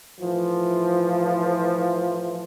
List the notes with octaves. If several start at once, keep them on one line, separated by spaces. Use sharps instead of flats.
A2 E3 F3